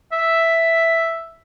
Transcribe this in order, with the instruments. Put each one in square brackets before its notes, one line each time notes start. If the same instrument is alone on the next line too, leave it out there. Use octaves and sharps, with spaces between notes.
[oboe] E5